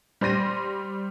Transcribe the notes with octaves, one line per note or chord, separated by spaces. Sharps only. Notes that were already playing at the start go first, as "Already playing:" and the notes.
G3 C5 C6 A#6 D#7